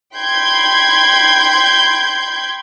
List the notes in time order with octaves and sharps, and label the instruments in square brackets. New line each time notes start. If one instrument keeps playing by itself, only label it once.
[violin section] G5 B5 C6 G6 G#6